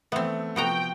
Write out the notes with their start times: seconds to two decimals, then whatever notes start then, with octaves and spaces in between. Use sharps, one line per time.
0.12 E3 A3 B3 C4
0.56 C3 F3 B3 F#4 G5 A#5